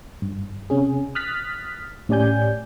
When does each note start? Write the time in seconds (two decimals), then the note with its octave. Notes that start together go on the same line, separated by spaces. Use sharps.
0.22 G2
0.70 C3 C#4 G#4
1.15 D#6 F6 F#6 A6 B6
2.09 A2 C#4 G4 D5 G#5 G6